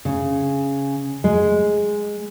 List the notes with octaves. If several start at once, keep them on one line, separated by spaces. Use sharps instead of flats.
C#3
G#3